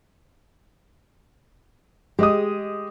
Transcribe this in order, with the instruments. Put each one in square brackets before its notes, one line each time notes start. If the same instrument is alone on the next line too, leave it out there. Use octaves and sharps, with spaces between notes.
[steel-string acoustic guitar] G#3 [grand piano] G4 D#5 D#6